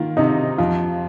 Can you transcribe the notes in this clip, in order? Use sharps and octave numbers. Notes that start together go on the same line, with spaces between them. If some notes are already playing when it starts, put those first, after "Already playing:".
Already playing: D#3 A#3 F4
C3 D#4
F2 F4